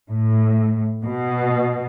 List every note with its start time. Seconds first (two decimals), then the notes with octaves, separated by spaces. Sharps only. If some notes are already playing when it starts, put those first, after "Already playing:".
0.10 A2
1.04 B2